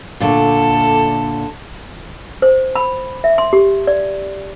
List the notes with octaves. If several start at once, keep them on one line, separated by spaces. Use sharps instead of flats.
A#2 D3 A3 A4
C5
B5
E5
C6
G4
D5